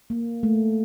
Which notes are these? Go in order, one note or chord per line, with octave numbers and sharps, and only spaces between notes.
A#3
A3